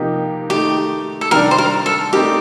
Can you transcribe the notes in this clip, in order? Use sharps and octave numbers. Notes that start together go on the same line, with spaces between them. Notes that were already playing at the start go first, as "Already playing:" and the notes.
Already playing: C3 F3 A#3 D#4 G4
D#3 A3 D#4 G4
A4
C3 D#3 G3 D4 A#4
C5
A#4
A4
A3 C4 D#4 G4 A#4